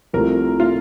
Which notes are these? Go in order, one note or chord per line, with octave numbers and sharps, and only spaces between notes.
C2 C3 F3 A3 A#4
F4